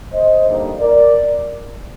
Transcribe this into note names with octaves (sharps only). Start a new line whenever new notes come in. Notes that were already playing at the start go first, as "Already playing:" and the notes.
C5 D#5
D3 G3 A#3 D#4
A#4 D5